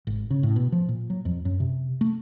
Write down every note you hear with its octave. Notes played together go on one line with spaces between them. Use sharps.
G#1
C#3
A2
B2
F3
A#2
F#3
F2
F#2
C3
A3